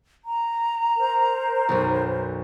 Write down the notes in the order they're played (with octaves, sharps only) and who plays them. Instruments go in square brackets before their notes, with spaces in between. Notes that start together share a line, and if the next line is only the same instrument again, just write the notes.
[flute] A#5
[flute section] A#4 C5
[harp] B1 F#2